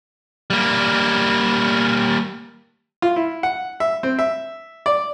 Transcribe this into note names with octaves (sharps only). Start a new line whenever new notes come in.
G3 A#3
F4
E4
F#5
E5
C4
E5
D5